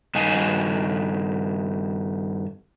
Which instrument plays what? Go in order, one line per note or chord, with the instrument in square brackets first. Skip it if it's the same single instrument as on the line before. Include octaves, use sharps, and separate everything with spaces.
[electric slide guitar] G2 D#3 D#5 F5 G#5